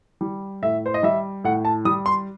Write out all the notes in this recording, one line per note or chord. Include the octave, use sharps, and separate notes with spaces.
G3
A2 E5
C5
D#5
G3 E5
A2 F#5
A5
G3 D#6
C6